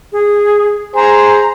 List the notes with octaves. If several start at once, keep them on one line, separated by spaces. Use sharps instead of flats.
G#4
G#4 C5 A#5